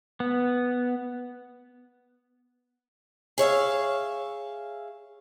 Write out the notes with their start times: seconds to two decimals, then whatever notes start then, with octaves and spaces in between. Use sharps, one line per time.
0.20 B3
3.38 G#4 C#5 E5 F5